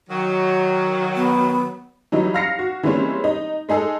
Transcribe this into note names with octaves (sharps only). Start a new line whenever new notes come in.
D#3 F#3
B3
E3 F#3 G3 D#4
F5 F6 A#6 C7 C#7
F#4
E3 G3 G#3 A#3 C4 C#4
D#4
G#3 D#4 G#4 A4